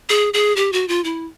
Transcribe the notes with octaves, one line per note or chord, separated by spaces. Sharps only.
G#4
G#4
G4
F#4
F4
E4